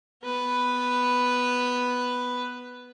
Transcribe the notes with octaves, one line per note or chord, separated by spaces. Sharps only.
B3 B4